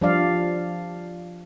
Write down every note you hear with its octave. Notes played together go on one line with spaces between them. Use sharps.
F3 G3 D4 F4 D5 F5